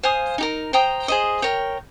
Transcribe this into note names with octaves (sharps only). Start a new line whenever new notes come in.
C5 F5 G#5 D#6
D#4 G4 A#4
C5 G5 A#5 D#6
G#4 C5 D#5
A#4 C#5 G5